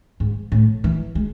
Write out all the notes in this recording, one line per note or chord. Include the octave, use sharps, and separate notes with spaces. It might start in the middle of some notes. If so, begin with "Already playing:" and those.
G#2
A2
E3
G#3